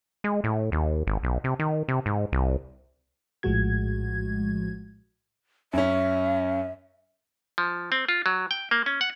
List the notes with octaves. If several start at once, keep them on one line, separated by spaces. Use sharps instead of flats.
G#3
A2
D#2
G#1
B1
C3
D#3
C3
G#2
C2
A#1 A2 F3 G#3 F#4 G#6
F#2 C#4 E5
F3
C4
F4
F#3
G5
A#3
C#4
F#5